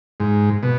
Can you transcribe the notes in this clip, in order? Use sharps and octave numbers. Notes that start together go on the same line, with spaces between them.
G#2
B2